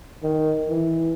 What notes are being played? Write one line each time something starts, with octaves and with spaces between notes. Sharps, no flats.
D#3
E3